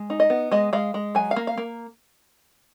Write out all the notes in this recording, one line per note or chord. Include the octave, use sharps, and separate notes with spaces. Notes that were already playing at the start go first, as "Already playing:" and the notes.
Already playing: G#3
D#4
D#5
B3
G#3 D#5
G#3 F5
G#3
F#3 G#5
F5
A#3
F5
A#3